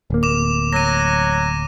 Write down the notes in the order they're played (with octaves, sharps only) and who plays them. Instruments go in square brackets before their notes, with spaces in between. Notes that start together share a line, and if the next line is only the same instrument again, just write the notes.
[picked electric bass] D1 A#3
[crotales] D6 E7
[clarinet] F#3 [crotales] A#6 D#7